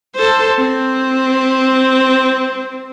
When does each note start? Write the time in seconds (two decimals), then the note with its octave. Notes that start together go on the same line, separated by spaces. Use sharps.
0.16 A4 C5
0.59 C4